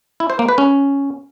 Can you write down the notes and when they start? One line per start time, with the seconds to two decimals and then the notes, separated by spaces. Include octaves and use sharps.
0.20 E4
0.30 C5
0.39 A#3
0.49 B4
0.58 C#4